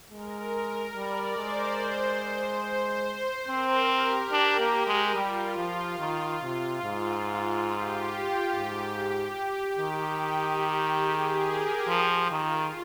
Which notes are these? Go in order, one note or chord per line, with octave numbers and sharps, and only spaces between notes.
G#3 A#4
G3 D5
G#3 C5
C5
C4 A#4
G4
D4
A#3
G#3
G3 F4
F3
D#3
C3
G#2
G4
G#2
D#3
G#4
A#4
F3
D#3 F4